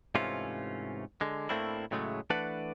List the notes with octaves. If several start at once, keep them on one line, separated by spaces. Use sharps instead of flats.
G#2 C3 E3 A3 C#4 F4
D3 G#3
A2 A3 A#3 C4 D4 E4
A2 C#3 F#3 G#3 A3
E3 A3 D4 B4 D5 F#5